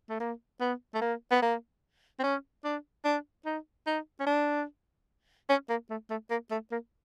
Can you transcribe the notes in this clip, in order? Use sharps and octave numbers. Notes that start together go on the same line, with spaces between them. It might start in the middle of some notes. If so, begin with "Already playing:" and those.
A3
A#3
B3
A3
A#3
B3
A#3
C4
C#4
D4
D4
D#4
D#4
C#4
D4
C#4
A#3
A3
A3
A#3
A3
A#3